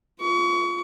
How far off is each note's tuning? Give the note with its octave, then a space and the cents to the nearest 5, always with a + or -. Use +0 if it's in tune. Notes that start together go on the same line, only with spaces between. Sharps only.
F4 +0 C#6 +35